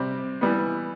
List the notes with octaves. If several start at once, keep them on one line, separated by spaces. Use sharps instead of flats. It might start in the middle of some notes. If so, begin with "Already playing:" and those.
Already playing: C3 G3 C4
E3 G3 B3